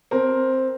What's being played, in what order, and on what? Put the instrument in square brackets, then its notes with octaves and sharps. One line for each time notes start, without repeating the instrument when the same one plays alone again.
[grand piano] C4 A#4